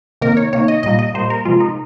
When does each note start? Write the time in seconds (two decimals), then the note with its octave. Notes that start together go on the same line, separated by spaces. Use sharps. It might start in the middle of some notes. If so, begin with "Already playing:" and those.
0.21 C3 D#3 A#3 A#4
0.37 C#5
0.53 C3 D#3 A#3 C#5
0.68 D#5
0.83 A#2 G3 A#3 D#5
0.99 D#5
1.14 A#2 G3 A#3 C5
1.30 A#4
1.45 C3 F3 G#3 F4
1.60 D#4